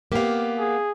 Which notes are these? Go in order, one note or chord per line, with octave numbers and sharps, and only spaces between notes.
A#3 B3 G4 F5
G#4